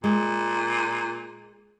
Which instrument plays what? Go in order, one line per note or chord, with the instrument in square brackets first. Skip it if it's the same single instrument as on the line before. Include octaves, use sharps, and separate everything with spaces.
[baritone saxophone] A#2 [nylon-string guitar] G#3